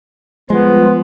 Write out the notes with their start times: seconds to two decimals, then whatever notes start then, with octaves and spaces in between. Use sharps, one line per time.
0.50 F3 G3 G#3 B3 F4